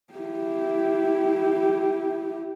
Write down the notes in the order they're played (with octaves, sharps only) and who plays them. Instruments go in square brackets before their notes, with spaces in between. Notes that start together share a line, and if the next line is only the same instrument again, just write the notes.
[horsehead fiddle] E4 G4